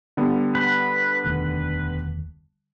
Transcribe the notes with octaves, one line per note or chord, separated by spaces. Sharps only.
D3 G3 B3
B4
E1 D2 D#3